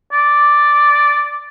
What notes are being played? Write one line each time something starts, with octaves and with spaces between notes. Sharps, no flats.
D5